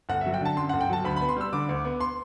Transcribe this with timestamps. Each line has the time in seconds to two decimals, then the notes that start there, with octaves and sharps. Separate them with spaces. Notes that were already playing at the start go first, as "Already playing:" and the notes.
0.09 G1 F#5
0.21 E5
0.26 F#3
0.34 G5
0.41 D3 A5
0.56 F#2 C6
0.69 G1 F#5
0.81 G5
0.89 F#3 A5
1.05 D2 B5
1.16 B5
1.21 B3
1.29 C6
1.37 G3 E6
1.53 D3 D6
1.69 D2
1.85 B3
2.01 C6